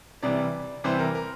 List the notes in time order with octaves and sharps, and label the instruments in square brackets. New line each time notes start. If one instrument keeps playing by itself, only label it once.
[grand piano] C3 E3 G3 D5
C3 E3 G3 C5
A#4
A#4